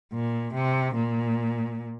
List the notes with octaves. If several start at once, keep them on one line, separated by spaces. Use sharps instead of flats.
A#2
C3
A#2